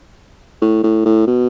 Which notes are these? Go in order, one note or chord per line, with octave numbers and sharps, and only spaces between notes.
A2
A2
A2
B2